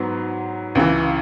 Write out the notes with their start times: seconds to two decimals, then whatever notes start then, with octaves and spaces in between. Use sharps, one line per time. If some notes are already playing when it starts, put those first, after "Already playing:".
Already playing: G#2 F#3 B3
0.75 C#2 C#3 E3